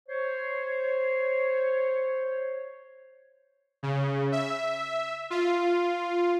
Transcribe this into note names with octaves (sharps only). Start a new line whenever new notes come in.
C5 C#5
C#3
E5
F4